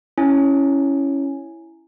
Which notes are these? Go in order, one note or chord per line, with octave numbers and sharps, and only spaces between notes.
C#4 E4 G#5